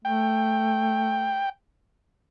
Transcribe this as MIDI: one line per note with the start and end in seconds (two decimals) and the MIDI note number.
0.05 1.42 57
0.05 1.49 79